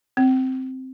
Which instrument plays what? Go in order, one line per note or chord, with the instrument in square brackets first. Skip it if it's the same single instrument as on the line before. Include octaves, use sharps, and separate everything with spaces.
[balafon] C4